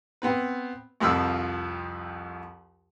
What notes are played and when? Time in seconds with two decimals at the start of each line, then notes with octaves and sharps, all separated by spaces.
0.22 B3 C4 B4
1.00 C2 F2 F3 F4 B5 E6